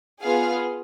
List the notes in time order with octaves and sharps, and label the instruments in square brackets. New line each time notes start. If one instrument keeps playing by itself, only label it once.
[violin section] B3 F4 G#4 F5